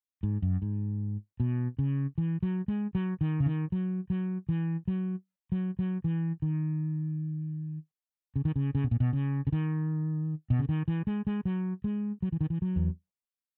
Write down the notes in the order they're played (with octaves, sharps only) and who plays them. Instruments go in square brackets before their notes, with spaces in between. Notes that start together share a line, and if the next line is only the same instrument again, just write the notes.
[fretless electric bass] G#2
F#2
G#2
B2
C#3
E3
F#3
G#3
F#3
D#3
C#3
D#3
F#3
F#3
E3
F#3
F#3
F#3
E3
D#3
C#3
D#3
C#3
C#3
B2
A#2
B2
C#3
C#3
D#3
B2
C#3
D#3
E3
G#3
G#3
F#3
G#3
F#3
E3
D#3
E3
F#3
E2